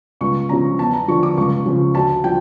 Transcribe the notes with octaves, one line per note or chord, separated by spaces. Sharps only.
C#2 C#6
C#3 F3 A#5
E2 A5
A#5
D3 F3 C#6
D6
C#2 C#6
C#3 F3
D2 A5
F3 G5